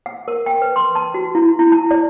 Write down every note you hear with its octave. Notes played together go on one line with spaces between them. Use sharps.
F#5
A#4
G5
B4
C6
A5
F#4
E4
E4
A5
D5